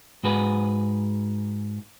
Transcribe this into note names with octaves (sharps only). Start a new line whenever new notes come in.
G#2 F#4 G#4 B4